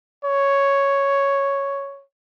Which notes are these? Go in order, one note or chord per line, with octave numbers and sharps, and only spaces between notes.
C#5